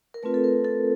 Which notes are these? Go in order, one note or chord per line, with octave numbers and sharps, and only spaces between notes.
A#4
A3 C4 F4 B4
A4
A#4
A4